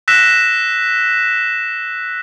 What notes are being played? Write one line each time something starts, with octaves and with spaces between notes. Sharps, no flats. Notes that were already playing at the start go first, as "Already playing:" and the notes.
E6 F#6 A#6 B6 E7